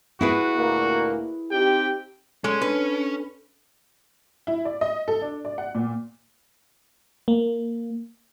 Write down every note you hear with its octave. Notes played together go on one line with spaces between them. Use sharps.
E4 F#4 G#4 B4
D2 A#2 A#3
C4 D#4 G4 G5
G#3 C#4 A4
D4 B4
E4
D5
D#5
A4
D4
D5
F#5
A#2
A#3